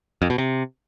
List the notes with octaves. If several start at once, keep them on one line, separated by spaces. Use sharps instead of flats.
F2
B2
C3